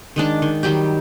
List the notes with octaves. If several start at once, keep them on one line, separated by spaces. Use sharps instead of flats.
D#3 G#3 D4 A5
D#3
D#3 F#3 G3 G4